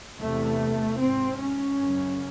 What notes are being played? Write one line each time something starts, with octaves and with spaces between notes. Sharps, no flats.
E2 C3 A3
G#2 C4
C#4
F#2 C#3